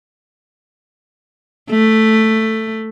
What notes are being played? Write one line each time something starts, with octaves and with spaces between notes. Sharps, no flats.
A3